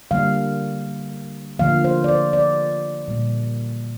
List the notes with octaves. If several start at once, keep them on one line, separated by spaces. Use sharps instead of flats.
D3 G3 A#3 F5
D3 F3 A#3 F5
C5
D5
C5
D5
A#2 G3 A#3